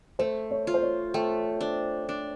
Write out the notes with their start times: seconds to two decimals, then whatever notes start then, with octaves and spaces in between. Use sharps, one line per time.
0.19 A3 C5
0.51 C#5
0.67 F4
0.74 C5
0.83 C#5
1.14 A3 G5
1.61 D4
2.09 D4